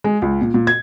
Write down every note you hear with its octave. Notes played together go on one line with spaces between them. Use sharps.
G#3
C#2
A#2
A#2
G#6